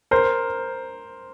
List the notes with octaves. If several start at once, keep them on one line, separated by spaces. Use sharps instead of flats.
A#4 C5